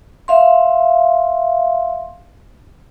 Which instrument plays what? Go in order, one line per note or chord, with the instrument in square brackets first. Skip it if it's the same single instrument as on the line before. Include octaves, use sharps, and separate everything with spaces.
[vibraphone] E5 F5 C6